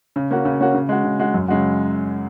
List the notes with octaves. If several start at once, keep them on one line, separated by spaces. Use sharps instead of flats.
C#3
A#3 C#4 F#4
C#3
A#3 C#4 F#4
C#3
G#3 F#4
C#3
G#3 F#4
F#2
C#3 G#3 F#4